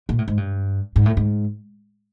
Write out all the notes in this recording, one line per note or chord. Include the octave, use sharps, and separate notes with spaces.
A#2
A2
G#2
G2
G#2
A2
G#2